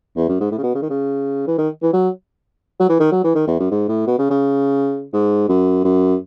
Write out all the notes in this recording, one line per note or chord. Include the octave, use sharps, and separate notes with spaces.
E2
F#2
G#2
A2
C#3
B2
C#3
D#3
C#3
E3
D#3
E3
F#3
F#3
E3
D#3
F#3
E3
D#3
E2
F#2
G#2
A2
B2
C#3
C#3
G#2
F#2
F#2